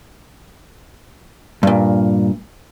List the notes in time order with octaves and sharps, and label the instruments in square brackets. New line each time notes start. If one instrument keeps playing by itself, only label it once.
[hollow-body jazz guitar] G2 A#2